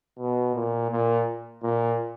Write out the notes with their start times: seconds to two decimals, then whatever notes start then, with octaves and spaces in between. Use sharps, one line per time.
0.18 B2
0.55 A#2
0.91 A#2
1.63 A#2